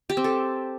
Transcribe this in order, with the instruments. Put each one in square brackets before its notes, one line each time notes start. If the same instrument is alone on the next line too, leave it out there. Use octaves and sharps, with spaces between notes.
[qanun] G4
C4
A4